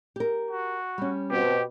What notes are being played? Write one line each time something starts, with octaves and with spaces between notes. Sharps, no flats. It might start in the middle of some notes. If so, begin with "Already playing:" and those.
G4 A#4
F#4
G3 C#4
B2 C4 G4